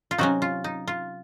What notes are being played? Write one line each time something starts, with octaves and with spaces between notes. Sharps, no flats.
F4
C3 F#3 C#4 D#4 F#4
F4
D#4
F4